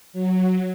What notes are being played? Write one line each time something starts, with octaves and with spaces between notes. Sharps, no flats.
F#3